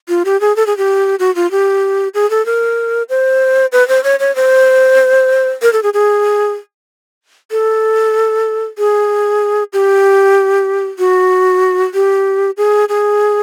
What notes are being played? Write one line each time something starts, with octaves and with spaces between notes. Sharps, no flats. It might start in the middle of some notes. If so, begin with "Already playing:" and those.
F4
G4
G#4
A4
G#4
G4
F#4
F4
G4
G#4
A4
A#4
C5
B4
C5
C#5
C#5
C5
A#4
A4
G#4
G#4
A4
G#4
G4
F#4
G4
G#4
G#4